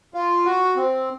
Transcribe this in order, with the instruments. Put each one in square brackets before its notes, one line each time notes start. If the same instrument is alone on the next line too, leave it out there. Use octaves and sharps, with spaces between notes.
[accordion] F4
F#4
C4